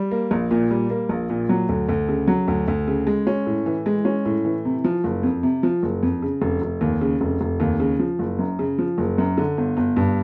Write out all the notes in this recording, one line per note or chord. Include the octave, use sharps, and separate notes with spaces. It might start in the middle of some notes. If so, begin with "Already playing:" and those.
Already playing: G3
A#3
A#1
A#2
G3
A#3
A#1
A#2
F#3
D2
D2
C#3
F#3
D2
D2
C#3
G#3
C#4
A2
E3
G#3
C#4
A2
E3
C3
F3
F#1
F2
C3
F3
F#1
F2
C#3
F1
F1
D#2
C#3
F1
F1
D#2
C#3
F3
F#1
F#2
C#3
F3
F#1
F#2
D3
G1
G1
G2